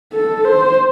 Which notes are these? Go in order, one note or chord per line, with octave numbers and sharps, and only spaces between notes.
A4
C5